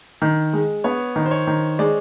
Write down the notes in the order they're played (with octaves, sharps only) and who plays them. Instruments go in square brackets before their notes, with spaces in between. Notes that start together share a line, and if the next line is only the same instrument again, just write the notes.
[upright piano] D#3
G#3
[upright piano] B3 [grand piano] C#5
[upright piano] D#3
[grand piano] C5
C#5
[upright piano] D#3
[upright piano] G#3 [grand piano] D5